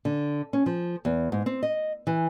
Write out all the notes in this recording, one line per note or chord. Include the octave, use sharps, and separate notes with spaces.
D3
C#4
F3
E2
G#2
C4
D#5
E3